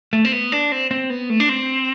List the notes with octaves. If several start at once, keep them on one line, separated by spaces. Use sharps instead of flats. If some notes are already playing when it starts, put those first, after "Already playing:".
A3
C4
B3
D4
C4
C4
B3
A3
D4
C4